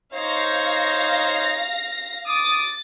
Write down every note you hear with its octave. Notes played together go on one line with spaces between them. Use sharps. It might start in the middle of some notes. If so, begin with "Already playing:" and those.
D#4 C5 C#5 F5 A#6
D6 D#6 A6